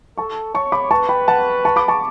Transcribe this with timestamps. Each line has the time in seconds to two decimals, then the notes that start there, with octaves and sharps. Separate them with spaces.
0.18 A4 A5 C#6
0.54 C#5 A5 C#6
0.72 B5 D6
0.91 B4 A5 C#6
1.09 G5 B5
1.28 F#5 A5
1.65 A5 C#6
1.76 B5 D6
1.88 A5 C#6